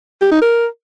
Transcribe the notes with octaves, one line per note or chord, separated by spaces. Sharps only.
G4
D#4
A#4